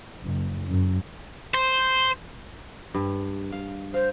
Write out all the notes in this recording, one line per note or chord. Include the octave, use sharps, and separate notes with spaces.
F#1
F#2
C5
G2
F5
C5 F5